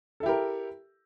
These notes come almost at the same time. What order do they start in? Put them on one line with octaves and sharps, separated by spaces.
A4 E4 G4 A#4